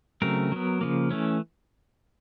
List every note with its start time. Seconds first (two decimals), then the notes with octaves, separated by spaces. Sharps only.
0.22 C#3 F#3 A3 C4 A#4
0.52 F#3 B3
0.81 C#3 F3 A#3
1.11 E3 A3 C#4